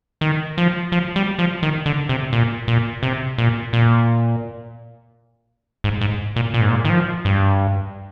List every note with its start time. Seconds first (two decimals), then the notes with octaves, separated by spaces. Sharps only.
0.21 D#3
0.58 F3
0.92 F3
1.16 G3
1.39 F3
1.63 D#3
1.86 D3
2.09 C3
2.33 A#2
2.68 A#2
3.03 C3
3.38 A#2
3.73 A#2
5.84 G#2
6.01 G#2
6.36 A#2
6.54 A#2
6.61 G#2
6.69 A#2
6.85 D#3
6.90 F3
7.25 G2